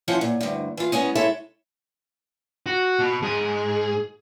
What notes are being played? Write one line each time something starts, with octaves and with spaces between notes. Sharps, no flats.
E3 F3 C#4 C5 F#5
A#2
D2 G2
E3 F4
G#3 B3 C#4 G#4
G#3 E4 A4 C#5 E5
F#4
B2
G#2 G#4